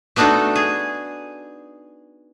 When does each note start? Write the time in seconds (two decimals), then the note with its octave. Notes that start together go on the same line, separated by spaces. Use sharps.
0.16 A3 B3 D4 D#4 F#4 A4
0.55 G#4